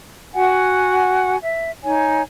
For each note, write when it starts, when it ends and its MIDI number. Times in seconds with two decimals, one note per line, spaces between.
0.34 1.37 66
0.34 1.37 78
0.34 1.37 80
1.43 1.71 76
1.83 2.21 63
1.83 2.21 73
1.83 2.21 80